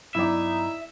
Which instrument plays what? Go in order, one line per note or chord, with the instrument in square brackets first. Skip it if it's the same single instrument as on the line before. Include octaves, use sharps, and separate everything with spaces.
[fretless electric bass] G2 F#3 B3 [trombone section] D#4 [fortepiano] E4 D5 [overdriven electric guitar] E5